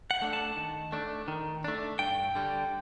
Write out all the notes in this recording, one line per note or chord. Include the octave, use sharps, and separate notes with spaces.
F#5
A3 D4
A5
D#3
A3 D4
D#3
A3 D4
G2 G5
D3 G3